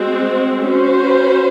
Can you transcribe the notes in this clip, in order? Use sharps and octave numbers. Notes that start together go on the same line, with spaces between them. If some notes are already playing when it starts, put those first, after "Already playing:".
Already playing: G#3 C4 F#4
C#4 F#4 C5